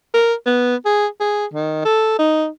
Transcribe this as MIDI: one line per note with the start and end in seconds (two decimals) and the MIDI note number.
0.14 0.34 70
0.46 0.75 59
0.85 1.07 68
1.20 1.46 68
1.54 1.83 51
1.85 2.15 69
2.19 2.47 63